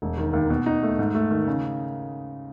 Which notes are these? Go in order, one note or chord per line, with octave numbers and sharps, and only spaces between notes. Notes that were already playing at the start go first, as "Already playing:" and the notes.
E1
D#3
D#2
B2
D#4
A3
G#2
A3
D#3
C#3